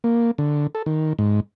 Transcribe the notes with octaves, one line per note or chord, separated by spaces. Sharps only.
A#3
D3
A4
D#3
G#2